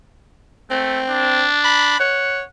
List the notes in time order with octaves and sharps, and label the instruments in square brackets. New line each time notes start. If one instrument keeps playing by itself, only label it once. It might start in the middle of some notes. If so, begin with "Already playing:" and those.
[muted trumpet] A3 [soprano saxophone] C4
[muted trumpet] D4
[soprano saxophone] B5
[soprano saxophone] C#5 [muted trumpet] F#5